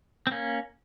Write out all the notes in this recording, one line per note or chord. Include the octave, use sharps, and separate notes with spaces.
C4
A#3 C#4